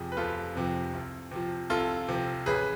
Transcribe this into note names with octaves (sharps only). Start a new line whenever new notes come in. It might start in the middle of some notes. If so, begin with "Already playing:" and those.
Already playing: F1 F2 C3 F3 G#4
B4
F1 F4 A4
F2 C3 F3
C2
C3 F3
C2 F4 A4
C3 F3
A1 G#4 B4